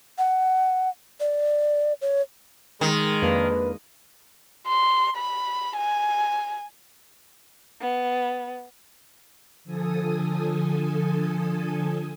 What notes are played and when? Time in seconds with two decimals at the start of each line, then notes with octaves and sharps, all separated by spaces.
0.18 F#5
1.20 D5
2.02 C#5
2.81 D#3 G#3
3.22 F2 A#3 D4 B4
4.67 C6
5.17 B5
5.77 G#5
7.81 B3
9.64 D3 F3 A4 G#5 D#6